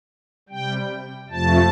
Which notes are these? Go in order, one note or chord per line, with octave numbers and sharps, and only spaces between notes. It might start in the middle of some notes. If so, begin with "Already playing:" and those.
C3 G3 G5
F2 C3 F3 A3 A5